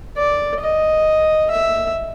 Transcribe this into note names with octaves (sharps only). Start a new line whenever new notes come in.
D5
D#5
E5